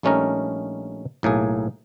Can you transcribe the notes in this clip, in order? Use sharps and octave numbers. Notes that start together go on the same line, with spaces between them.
A#1 G3 A3 C#4 D#4 A#4
B1 A2 A#3 G#4